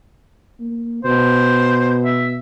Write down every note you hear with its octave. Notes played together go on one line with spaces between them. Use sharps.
A#3
B2 C5
E5